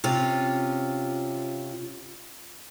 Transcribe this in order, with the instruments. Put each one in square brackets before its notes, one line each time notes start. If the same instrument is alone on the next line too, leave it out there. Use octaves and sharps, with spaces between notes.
[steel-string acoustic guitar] C3 C#4 F4